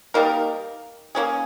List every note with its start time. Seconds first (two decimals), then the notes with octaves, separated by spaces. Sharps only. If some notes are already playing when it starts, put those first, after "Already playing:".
0.14 G3 A#3 D#4 A#4
1.15 A#3 C#4 G#4